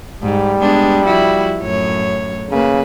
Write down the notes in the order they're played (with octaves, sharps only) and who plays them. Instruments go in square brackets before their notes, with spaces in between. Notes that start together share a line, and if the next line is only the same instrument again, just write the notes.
[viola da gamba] G#2 [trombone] G3
[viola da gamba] G#3 B3 D4
F3 E4 F#4
F#2 A2 C#5
[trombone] C#3 [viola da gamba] A#3 B4